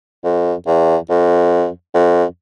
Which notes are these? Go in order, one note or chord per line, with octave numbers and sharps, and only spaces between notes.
F2
E2
F2
F2